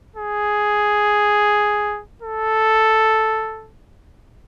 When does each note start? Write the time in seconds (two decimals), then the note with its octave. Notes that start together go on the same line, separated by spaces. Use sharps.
0.16 G#4
2.22 A4